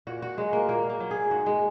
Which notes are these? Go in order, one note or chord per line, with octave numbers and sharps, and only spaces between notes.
A#2 F#4
F#4
F#3 G#3
A#3
A#2 A#3
A#3
F#3
G#4
G#2 F#4
G#3